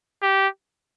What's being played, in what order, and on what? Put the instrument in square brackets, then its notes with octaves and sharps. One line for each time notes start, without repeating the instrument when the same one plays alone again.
[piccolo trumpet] G4